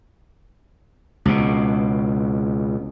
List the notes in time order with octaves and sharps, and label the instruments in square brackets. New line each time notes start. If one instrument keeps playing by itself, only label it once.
[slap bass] C#2 B2